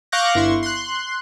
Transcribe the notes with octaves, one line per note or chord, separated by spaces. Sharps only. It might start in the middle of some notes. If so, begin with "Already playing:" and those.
F5 C#6 D6 F#6 G6 A#6
G1 E4 C6 C#6
C6 F#6